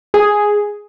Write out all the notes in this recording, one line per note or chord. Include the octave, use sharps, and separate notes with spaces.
G#4